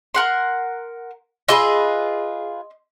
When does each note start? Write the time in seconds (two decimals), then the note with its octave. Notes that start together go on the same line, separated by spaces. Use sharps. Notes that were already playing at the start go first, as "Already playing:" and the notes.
0.14 A#4 F#5 C6
1.49 F4 G#4 B4 D#5 C6 E6